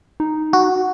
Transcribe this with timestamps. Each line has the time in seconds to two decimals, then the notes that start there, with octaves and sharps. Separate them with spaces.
0.20 D#4
0.53 F#4